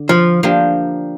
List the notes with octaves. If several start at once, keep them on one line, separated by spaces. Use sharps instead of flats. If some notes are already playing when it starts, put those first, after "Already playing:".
Already playing: D3
F3
F3 A#3 D4 G4